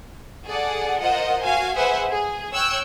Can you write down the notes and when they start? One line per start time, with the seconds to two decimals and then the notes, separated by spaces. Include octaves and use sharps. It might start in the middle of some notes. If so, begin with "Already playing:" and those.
0.45 G#4 A4 D5 F#5
1.00 F4 A#4 C5 D#5 F#5
1.43 F#4 F5 G#5
1.75 G#4 B4 C5 E5 F#5 G#5
2.10 G#4
2.53 C#5 G5 E6 F#6